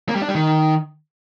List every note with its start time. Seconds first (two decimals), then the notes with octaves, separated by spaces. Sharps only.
0.09 A#3
0.15 G3
0.22 D4
0.28 G3
0.35 D#3